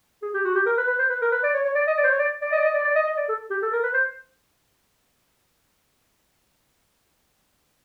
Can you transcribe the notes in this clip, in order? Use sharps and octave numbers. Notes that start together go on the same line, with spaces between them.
G#4
G4
F#4
G4
A#4
B4
B4
C5
B4
A#4
B4
D5
C#5
C#5
D5
D#5
D5
C5
C#5
D5
D5
D#5
D5
D#5
D5
D5
D#5
D#5
D5
A4
G4
A4
A#4
B4
C5